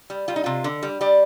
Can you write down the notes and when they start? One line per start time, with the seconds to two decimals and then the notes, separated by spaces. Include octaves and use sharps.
0.10 G3
0.28 G3 F4
0.36 D#4
0.44 C3 F4
0.64 D3
0.83 G3
1.01 G3 D5